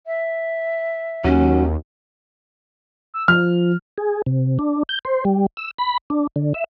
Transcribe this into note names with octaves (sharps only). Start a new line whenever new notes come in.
E5
D#2 F#3 C#4
E6
F3 F6
G#4
C3
D4
G6
C5
G3
E6
B5
D4
D3
E5